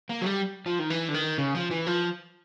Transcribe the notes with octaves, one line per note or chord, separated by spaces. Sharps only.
A#3
F#3
G3
F3
D#3
E3
D3
D#3
C#3
F3
E3
F3